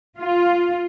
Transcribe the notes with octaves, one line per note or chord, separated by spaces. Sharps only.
F4